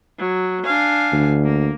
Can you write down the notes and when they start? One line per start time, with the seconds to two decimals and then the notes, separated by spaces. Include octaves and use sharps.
0.19 F#3
0.64 D4 F5 G#5
1.13 D2
1.43 A#3